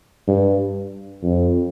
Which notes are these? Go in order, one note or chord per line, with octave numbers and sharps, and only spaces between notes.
G2
F2